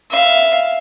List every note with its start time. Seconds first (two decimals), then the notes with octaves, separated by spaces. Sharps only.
0.10 E5 F5